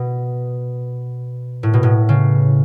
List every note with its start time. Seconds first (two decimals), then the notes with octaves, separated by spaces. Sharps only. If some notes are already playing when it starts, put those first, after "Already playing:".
Already playing: B2
1.63 A2
1.73 B2
1.83 A2
2.09 C#3